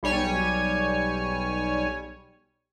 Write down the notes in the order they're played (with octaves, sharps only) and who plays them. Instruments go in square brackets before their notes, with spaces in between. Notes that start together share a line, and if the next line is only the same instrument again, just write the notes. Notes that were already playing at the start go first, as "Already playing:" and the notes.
[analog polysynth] B1 G3 C#5 G#5